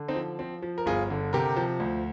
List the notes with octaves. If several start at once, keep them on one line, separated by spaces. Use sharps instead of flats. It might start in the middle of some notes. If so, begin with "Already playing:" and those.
Already playing: D3
C4 D#4
F3
F3 C4
F3
A#4
G1 F4 G#4
D3
C3 G4 A#4
F3
D2